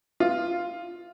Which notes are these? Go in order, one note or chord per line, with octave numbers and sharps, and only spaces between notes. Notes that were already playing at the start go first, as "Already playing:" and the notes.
F4